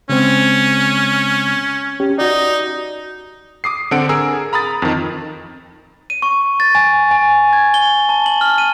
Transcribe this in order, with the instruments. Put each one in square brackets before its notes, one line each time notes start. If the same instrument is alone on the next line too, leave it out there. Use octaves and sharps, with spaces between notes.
[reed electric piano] C#3 G#3 C4 [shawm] C#4
[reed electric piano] C#4 G4
[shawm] D#4 [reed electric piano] F#4 D5
[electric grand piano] D6 D#6 C7
D3 C4 A4 F#5 D7
G#4 A#4 E6
A#5 B5 D#6 A6
F2 D#3
[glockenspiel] D#7
C#6
A6
G#5
G#5
G#6
G7
A5
F#7
F6
D#7